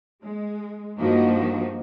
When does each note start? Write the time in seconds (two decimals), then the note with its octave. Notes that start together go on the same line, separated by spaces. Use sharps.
0.23 G#3
0.98 G2 D#3 F3 A#3 D#4 F#4